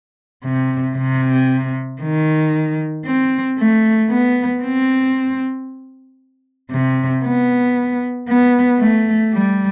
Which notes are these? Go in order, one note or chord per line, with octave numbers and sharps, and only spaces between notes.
C3
C3
D#3
C4
A3
B3
C4
C3
B3
B3
A3
G3